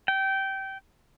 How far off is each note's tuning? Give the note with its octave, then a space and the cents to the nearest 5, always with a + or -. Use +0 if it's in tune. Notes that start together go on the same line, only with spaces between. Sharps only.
G5 -20